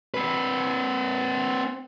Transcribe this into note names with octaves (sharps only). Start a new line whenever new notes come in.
C4 B4